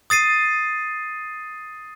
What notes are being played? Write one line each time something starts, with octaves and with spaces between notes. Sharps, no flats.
D#6 A6 C7 D#7